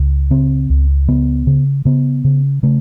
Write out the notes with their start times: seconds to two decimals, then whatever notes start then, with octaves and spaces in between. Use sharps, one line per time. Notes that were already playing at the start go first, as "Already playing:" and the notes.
Already playing: C#2
0.31 C#3 C4
0.70 C#2
1.08 C#3 B3
1.47 C#3
1.85 C#3 B3
2.24 C#3
2.63 C#3 A3